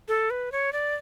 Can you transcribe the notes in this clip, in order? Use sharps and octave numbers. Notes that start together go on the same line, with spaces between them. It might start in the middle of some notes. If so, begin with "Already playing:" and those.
A4
B4
C#5
D5